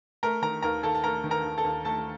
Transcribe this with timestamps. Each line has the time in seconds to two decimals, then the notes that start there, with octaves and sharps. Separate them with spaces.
0.23 A3 A#4 A#5
0.42 D#3 A#4 A#5
0.62 D#2 A#4 A#5
0.83 D#2 A4 A5
0.95 A5
1.04 A3 A#4 A#5
1.24 D#3
1.31 A#4 A#5
1.44 D#2
1.58 A4 A5
1.64 D#2
1.85 A3 A4 A5